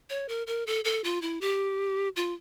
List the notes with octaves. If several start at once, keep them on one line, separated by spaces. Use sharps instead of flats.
C#5
A#4
A#4
A4
A4
F4
E4
G4
F4